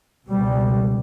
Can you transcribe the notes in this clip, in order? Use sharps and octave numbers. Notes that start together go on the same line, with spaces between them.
C#2 B2 G3